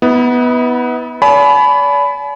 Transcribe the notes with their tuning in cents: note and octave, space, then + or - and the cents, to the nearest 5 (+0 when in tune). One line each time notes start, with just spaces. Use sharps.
B3 +0 E4 -40
D5 -45 G#5 +45 B5 +10